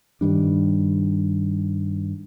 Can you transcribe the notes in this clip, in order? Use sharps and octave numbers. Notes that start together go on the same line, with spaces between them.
G2 D#3 G3 D4